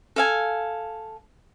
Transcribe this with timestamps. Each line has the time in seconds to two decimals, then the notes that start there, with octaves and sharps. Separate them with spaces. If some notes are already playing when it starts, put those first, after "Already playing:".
0.16 A4 F5 G#5